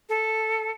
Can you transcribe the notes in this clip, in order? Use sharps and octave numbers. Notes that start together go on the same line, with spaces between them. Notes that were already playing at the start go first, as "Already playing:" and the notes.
A4